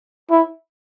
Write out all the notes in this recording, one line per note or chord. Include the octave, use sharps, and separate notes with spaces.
E4